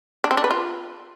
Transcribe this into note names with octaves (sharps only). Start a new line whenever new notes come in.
D4
C4
D4
B4
F4